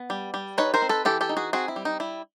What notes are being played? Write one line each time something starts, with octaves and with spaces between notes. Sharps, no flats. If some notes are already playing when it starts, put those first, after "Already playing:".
Already playing: B3
G3
G3
D#4 B4 C#5
A#4 C5
C4
A4 B4
E3 G4 A4
G4 A4
D#4
F#4 G#4
C4 F#4 G#4
E4
G3
D#4
G3 E4